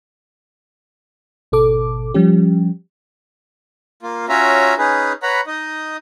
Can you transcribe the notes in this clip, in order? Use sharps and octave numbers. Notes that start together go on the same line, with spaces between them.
G#1 B2 A4 D6
F3 G3 C#4 G4
A#3 F4
C#4 F4 F#4 C#5 E5 A#5
C#4 D#4 G#4 B4
B4 C#5 F#5 A#5 B5
D#4 D#5